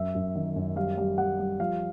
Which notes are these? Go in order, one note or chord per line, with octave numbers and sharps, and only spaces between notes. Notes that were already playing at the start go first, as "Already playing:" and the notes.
Already playing: F#2 E5
F#2
D#3
F#2
G3 F5
G3
G3 F#5
G3
F3 F5